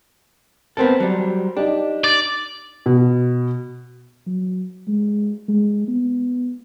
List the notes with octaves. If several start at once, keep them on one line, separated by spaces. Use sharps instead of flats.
B3 C4 A4 A#4 C5
F#3 G3
D4 D#4 G4
D5
B2
F#3
G#3
G#3
B3